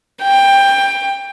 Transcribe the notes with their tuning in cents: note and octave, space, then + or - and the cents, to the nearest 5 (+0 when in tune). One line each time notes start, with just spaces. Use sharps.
G5 +15